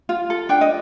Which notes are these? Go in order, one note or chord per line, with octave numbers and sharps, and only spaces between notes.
F4
A4
D4 G5
D#5